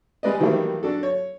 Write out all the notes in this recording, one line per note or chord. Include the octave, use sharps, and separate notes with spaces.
G3 G#3 B4 D5 D#5
D#3 E3 F#3 G3 A3 A#3
D4 F#4 A4
C#5